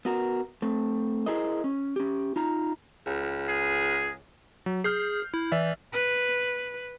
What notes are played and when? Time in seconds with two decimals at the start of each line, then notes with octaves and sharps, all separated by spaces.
0.05 B3 F#4 A#4
0.62 A3 C4
1.26 E4 G#4 A#4 C5 D#5
1.64 C#4
1.96 C#4 G4
2.36 D#4 F4 A#5
3.06 C#2
3.49 G#4
4.66 F#3
4.84 G#4 F6 G6 C7
5.34 E4
5.52 E3 D5 E5
5.92 B4